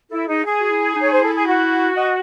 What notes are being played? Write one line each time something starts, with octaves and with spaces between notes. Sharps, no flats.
E4 A4
D#4 G#4
G#4
F#4
E4
D#4
C#5
C5
E4 A4
G#4
F#4
D#5